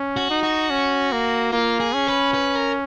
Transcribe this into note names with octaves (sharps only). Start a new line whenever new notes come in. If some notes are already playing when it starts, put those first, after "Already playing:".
Already playing: C#4
F#4
D#4
F#4
C#4
A#3
A#3 F4
G#4
C#4
B4
B4
A#4